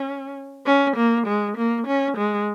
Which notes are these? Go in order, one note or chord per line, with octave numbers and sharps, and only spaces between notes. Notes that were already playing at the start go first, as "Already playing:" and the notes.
Already playing: C#4
C#4
A#3
G#3
A#3
C#4
G#3